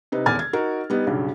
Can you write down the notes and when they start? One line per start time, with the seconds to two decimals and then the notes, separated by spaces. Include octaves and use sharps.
0.12 C3 D#4 B4
0.26 D#1 E2 G#5 F6 A6
0.39 G#6
0.53 D#4 F#4 A#4
0.90 G3 B3 D#4
1.07 B1 G2 C#3